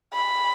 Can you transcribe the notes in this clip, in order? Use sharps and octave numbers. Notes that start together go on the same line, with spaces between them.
B5